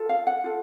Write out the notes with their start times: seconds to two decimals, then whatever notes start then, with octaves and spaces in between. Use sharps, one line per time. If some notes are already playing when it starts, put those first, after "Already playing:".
Already playing: F4 A4
0.09 F5
0.27 F#5
0.44 F4 A4